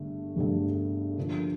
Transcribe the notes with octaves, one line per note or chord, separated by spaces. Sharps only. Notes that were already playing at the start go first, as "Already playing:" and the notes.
Already playing: G1 G2 D3 A3
G1 G2 D3 A3
D3 F3 A#3 D4